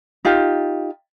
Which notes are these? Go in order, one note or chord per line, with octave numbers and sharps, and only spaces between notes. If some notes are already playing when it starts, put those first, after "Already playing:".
D#4 F4 G4